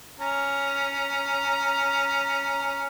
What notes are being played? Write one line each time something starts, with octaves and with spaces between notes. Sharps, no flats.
C#4 A#5